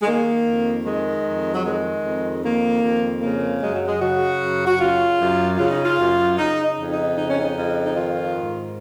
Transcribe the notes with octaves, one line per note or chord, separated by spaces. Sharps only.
G#3
D#3 A#3
F2
D#3 G#3
F2
F#3
D#3 G#3
F2
D#3 A#3
F2
C#3 A#3
F#2 G#3
F#3
G#3
C#3 F#4
F#2
F#4
C#3 F4
F#2
C#3 F4
D#4
F4
F#2
C#3 D#4
D#4
F2
D#4
C#3 D#4
C#4
D#4
F2
D#4
D#3 F4
G#2